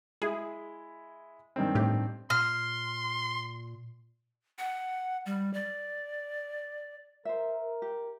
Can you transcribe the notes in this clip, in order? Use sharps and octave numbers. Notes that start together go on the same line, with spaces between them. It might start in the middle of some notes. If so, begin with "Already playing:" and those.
G#3 E4 G#4
G2 D#3 C4
A2 G4
A#2 C6 F6
F#5
G3
D5
A#4 C5 E5
G4